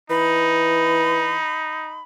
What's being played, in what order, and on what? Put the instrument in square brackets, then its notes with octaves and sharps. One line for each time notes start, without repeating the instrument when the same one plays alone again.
[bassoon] E3 [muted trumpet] D#4 [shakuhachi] B5